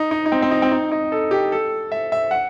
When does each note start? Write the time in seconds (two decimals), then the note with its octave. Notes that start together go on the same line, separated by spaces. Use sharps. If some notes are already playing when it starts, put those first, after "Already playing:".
Already playing: D#4
0.11 D#4
0.26 D#4
0.32 C4
0.42 C4
0.51 D#4
0.62 C4
0.72 D#4
0.92 D#4
1.12 A4
1.31 G4
1.52 A4
1.92 E5
2.12 E5
2.31 F#5